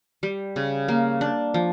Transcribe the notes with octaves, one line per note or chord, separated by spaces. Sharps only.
G3
C#3
A#3
D4
F3